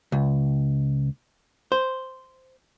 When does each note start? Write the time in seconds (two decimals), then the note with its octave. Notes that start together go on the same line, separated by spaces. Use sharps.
0.12 C#2
1.72 C5